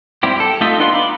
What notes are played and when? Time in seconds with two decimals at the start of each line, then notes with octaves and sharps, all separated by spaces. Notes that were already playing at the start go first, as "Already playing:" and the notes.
0.23 G3 C4 E4 G4
0.36 G4 A4
0.61 A3 D#4 F4 D#5 E5
0.79 B3 D4 F4 B4 C6
0.93 F5 A#5 B5 D6